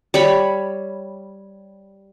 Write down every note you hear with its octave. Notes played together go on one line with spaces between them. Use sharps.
G3 C#5 B5